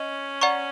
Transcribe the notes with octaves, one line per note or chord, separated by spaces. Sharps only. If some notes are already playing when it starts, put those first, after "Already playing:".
Already playing: C#4 D#5
D5 F#5 A#5 C#6